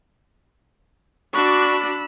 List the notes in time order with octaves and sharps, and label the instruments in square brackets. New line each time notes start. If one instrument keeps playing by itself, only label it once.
[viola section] D4 F#4 D5 [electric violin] B5 E6 [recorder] C#6